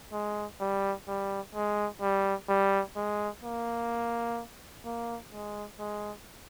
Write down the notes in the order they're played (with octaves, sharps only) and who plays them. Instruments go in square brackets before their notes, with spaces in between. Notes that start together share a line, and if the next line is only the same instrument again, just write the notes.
[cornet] G#3
G3
G3
G#3
G3
G3
G#3
A#3
A#3
G#3
G#3